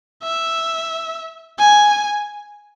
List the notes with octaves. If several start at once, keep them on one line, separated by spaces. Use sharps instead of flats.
E5
G#5